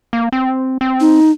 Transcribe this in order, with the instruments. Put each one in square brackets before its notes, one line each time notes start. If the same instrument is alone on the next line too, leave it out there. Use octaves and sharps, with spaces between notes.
[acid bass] A#3
C4
C4
[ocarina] D#4